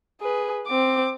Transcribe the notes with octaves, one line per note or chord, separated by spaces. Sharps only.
G#4 B4
C4 D6